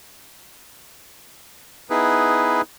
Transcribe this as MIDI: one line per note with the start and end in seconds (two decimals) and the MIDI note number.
1.90 2.61 59
1.90 2.61 63
1.90 2.61 64
1.90 2.61 68
1.90 2.61 71